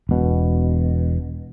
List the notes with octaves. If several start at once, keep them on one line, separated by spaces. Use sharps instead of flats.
E1 B2